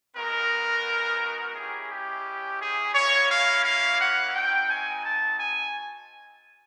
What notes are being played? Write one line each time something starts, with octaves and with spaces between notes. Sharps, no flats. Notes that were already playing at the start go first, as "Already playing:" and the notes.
G#3 B3 D#4 F#4 A#4
G#3 C#4 E4 G4 G#4
G4
G#4
A#3 C#4 E4 C#5
F5
F5
F#5
C4 D#4 F#4 G5
G#5
A5
G#5